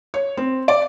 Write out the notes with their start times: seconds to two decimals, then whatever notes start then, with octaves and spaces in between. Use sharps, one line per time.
0.14 C#5
0.37 C4
0.68 D5